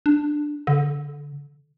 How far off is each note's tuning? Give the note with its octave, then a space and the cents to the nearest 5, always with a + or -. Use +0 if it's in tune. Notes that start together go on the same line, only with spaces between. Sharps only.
D4 +10
D3 -20